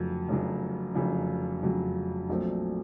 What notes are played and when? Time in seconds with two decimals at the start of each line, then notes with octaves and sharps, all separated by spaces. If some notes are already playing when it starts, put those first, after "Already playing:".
Already playing: F1 F2 C#3 F#3
0.28 F1 F2 C#3 F#3
0.95 F1 F2 C#3 F#3
1.62 F1 F2 C#3 F#3
2.29 A#1 A#2 F#3 A3 C4